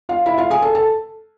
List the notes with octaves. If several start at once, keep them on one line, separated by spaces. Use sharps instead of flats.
F4 F5
E4 E5
F4 F5
G#4 G#5
A4 A5
A4 A5